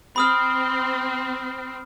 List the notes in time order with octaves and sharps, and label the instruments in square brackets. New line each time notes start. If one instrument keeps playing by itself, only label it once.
[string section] C4 [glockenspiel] B5 D#6 F6